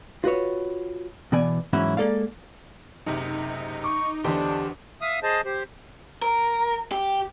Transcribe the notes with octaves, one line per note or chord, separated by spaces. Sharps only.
F4 F#4 B4 C#5
B2 E3 B3 D5 G#5
G#2 E3 F#3 C#4 E4 F#4
G#3 A#3 A4 D5 F5
F#1 C3 D#4
C#6 D6
E2 D3 D4 G4 C5 D#5
E5 F5 D#6
G#4 C5 D#5 A5
G4 C5
A#4
G4